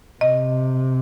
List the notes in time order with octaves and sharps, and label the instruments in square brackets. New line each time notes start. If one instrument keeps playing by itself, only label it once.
[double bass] C3 [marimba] D#5